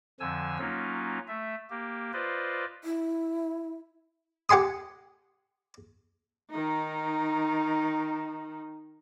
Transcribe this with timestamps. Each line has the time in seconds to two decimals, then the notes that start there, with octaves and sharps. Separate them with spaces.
0.20 F2 D3 F3 G#5 E6
0.58 F#3 A#3 C#4 D#4 F4
1.28 A3 E5
1.70 A#3 G4
2.13 F4 B4 C5 D5 D#5
2.84 E4
4.49 G4 F#5 G#5 C6 D#6
6.50 D#3 D#4